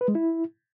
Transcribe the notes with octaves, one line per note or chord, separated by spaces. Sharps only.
B4
G#3
E4